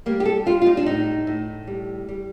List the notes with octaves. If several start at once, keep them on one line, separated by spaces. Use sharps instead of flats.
G3 A#3
G4
A4
G3 F4
F4
D#4
D4
A2 D#4
A2
G3
G3